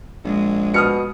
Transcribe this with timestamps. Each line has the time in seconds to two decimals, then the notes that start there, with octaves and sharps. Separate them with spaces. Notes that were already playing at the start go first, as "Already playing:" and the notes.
0.25 A#1 G#3
0.74 B2 D#6 F6 C#7